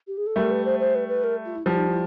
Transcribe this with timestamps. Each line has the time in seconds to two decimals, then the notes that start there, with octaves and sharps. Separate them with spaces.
0.07 G4
0.17 G#4
0.26 A4
0.36 G3 A3 A#4
0.50 B4
0.64 C5
0.79 C5
0.95 B4
1.08 B4
1.23 A#4
1.45 F4
1.55 E4
1.66 F3 G3 E4
1.77 D#4
1.88 E4